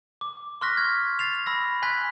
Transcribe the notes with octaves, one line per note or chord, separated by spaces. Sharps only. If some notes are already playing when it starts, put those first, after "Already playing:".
D6
C6 C#6 F6 F#6 A#6 B6
F6 G#6
A6 C7 F7
B5 E6 A#6
G#5 C6 F#6 G#6 B6